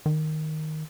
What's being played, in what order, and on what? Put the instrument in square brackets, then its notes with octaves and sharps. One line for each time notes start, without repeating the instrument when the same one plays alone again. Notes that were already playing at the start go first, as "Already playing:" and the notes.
[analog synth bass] D#3